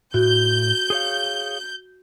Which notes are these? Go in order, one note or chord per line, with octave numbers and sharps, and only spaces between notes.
A2 F#4 G6
G#4 C#5 F5